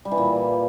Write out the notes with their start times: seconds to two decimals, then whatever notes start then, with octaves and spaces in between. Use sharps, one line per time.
0.05 G3
0.11 E3
0.18 A#2